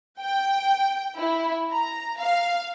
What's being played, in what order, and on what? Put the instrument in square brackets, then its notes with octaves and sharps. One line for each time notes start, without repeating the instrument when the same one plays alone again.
[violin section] G5
E4
A#5
F5